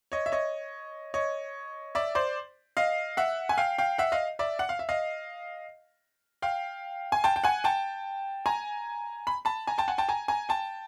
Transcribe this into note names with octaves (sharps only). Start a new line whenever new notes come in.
C#5 D#5
E5
C#5 D#5
C#5 D#5
D5 E5
C5 D5
D#5 F5
E5 F#5
G#5
F5 G5
F5 G5
E5 F#5
D#5 F5
D5 E5
F#5
F5
E5
D#5 F5
F5 G5
G#5
G5 A5
G5
F#5 G#5
G5 A5
G#5 A#5
B5
A5 B5
G#5 A#5
G5 A5
F#5 G#5
G5 A5
G#5 A#5
G#5 A#5
G5 A5